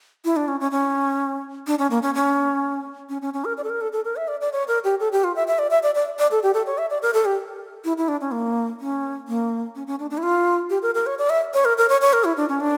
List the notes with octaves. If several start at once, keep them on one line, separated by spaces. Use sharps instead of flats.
E4
D4
C#4
C#4
C#4
D4
C#4
A#3
C#4
C#4
C#4
C#4
C#4
A#4
D5
A4
A#4
A4
A4
A#4
E5
D5
D5
C#5
A#4
G4
A4
G4
F4
E5
E5
D5
E5
D5
D5
D5
A4
G4
A4
C#5
E5
D5
A#4
A4
G4
E4
E4
D4
C#4
A#3
C#4
A#3
C#4
C#4
D4
D4
E4
F4
G4
A#4
A#4
C#5
D5
E5
C#5
A#4
A#4
C#5
C#5
A#4
E4
D4
C#4
D4